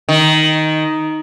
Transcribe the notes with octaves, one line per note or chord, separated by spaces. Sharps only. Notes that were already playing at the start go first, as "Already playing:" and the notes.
D#3